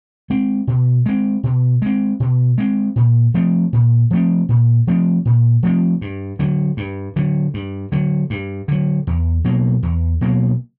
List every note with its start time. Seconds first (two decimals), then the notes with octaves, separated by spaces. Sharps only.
0.30 G#3 C4
0.67 B2
1.06 G#3 C4
1.44 B2
1.82 G#3 C4
2.20 B2
2.58 G#3 C4
2.96 A#2
3.34 F3 A3 C4
3.73 A#2
4.10 F3 A3 C4
4.49 A#2
4.87 F3 A3 C4
5.25 A#2
5.63 F3 A3 C4
6.01 G2
6.39 D3 F#3
6.77 G2
7.16 D3 F#3
7.54 G2
7.92 D3 F#3
8.30 G2
8.68 D3 F#3
9.07 E2
9.44 B2 F#3 A#3
9.83 E2
10.21 B2 F#3 A#3